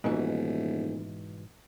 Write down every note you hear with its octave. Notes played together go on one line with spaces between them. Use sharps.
D#1 G#2 B2 E3